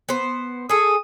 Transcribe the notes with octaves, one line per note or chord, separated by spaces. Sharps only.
B3 C5
G#4 A4 D#6